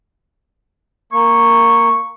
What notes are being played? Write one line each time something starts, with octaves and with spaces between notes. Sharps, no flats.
A#3 C#6